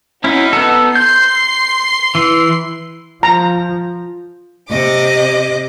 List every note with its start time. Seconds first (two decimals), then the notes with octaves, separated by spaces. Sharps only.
0.24 C#4 D#4 E4 F#4
0.53 B3 A4
0.95 C6 G6 C7
2.15 E3
3.23 F3 A#5
4.69 C3 D#5 D6